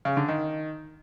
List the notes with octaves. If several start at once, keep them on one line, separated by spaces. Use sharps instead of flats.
C#3
D3
D#3